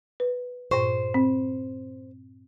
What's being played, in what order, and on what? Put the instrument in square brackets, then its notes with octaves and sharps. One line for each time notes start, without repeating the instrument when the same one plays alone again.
[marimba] B4
[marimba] G2 A#2 C#6 [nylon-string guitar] C5
[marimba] C4